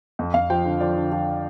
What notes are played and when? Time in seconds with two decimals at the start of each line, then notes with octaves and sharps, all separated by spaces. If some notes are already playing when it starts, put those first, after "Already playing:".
0.19 F2
0.34 F2 F5
0.50 F3 G5
0.65 D3
0.80 F3 D5
0.96 D3
1.12 F3